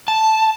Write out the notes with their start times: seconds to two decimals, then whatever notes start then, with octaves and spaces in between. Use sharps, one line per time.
0.08 A5